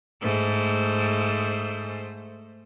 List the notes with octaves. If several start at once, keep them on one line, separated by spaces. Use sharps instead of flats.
G#2 A3 C5